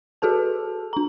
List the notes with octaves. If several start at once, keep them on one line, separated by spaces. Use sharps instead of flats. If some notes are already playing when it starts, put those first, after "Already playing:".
F#4 G#4 A4 B4 A5
D4 A#5